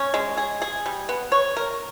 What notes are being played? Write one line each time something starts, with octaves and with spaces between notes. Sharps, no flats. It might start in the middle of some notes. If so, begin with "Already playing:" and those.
Already playing: C#4
G#3
G#4
G#4
G3
B3
C#5
A#4